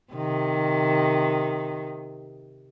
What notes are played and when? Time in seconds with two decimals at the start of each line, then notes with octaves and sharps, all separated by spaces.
0.13 C3 D#3